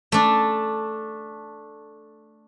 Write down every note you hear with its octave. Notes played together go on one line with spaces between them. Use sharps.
A3 D4